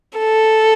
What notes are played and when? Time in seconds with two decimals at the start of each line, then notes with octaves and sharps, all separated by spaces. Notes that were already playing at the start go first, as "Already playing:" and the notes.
0.19 A4